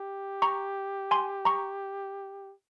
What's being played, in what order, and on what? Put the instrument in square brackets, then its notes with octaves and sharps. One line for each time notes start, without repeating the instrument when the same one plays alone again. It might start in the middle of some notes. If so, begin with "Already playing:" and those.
Already playing: [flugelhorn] G4
[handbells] A#5 C#6
G#5 C6
A#5 C#6